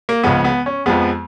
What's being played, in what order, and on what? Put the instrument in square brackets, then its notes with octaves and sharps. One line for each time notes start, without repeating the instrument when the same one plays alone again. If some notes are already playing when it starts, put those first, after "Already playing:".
[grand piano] A#3
C#2 C#3 F3 G#3 B3
B3
C#4
F2 F3 G#3 B3